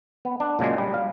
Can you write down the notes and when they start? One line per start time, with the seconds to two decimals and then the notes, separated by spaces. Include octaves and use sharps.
0.25 B3
0.40 D4
0.59 A#2 C#3 F#3 G#3
0.78 G3
0.94 F5